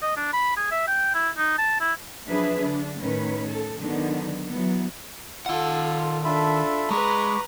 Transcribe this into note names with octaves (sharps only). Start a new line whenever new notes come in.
D#5
D4
B5
G#4
E5
G5
E4
D#4
A5
E4
F3 F#3 D4 G#4 B4 E5
D3 D4
A2 D#3 C#4 B4
A4
D3 D#3 F#3 B3 D4
E3 F#3 B3
D#3 F4 A4 F#5
D4 F4 A4 E5 B5
G#3 G#4 B4 A#5 B5 C#6 D6